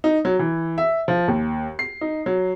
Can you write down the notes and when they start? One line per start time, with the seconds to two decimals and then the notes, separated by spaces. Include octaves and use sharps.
0.04 D#4
0.25 F#3
0.39 E3
0.78 E5
1.08 F3
1.28 D#2
1.79 C7
2.01 D#4
2.26 F#3